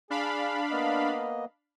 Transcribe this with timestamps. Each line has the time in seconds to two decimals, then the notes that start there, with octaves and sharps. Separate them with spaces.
0.10 D4 G#4 F5 B5
0.71 A#3 B3 D#5